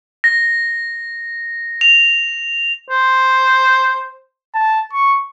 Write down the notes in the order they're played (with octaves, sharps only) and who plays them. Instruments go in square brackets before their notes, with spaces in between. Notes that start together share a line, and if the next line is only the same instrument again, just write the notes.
[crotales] A#6
F7
[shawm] C5
[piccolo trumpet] A5
C#6